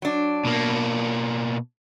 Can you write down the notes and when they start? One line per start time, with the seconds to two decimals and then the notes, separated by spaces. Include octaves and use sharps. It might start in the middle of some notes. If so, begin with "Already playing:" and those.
0.02 F#3 D4
0.45 B2 A#3